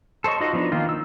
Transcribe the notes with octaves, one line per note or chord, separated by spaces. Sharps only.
A4 C5 C#5 D#5 C#6
D#4 F4 F#4 D#5
F3 B3 D4 D#4
D#3 A#3 D#4 F4
E6